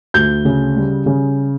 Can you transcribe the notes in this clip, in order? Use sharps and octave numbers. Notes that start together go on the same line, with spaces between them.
D2 G6
C#3
G3
C#3